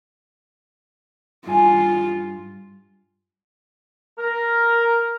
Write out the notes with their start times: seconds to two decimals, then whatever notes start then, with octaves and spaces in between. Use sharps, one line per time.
1.46 G2 F4 G#5
4.18 A#4